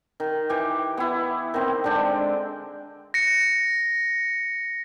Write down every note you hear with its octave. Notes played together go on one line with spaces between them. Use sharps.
D#3
E3 G4
B3 E4
D#3 C4
D3 G#3 D4 G5
A#6 C#7